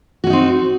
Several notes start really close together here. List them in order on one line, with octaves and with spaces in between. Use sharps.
F#4 C#4 D#4 C4